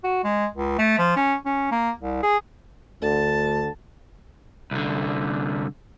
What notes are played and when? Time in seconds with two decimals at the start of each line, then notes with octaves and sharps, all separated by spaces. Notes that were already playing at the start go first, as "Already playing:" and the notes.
0.04 F#4
0.24 G#3
0.56 C#2
0.78 A3
0.99 F3
1.16 C#4
1.46 C#4
1.71 A#3
2.01 C2
2.23 G#4
3.02 D2 D3 A5
4.71 C2 D3